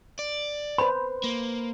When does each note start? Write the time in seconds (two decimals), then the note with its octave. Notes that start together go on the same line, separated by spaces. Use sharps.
0.19 D5
0.78 B4 C5 B5
1.24 A#3